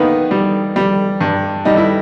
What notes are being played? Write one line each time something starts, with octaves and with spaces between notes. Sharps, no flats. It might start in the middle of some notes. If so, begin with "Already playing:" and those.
Already playing: D#3 A#3 B3
G3
G3
G2
G3 D#4
E4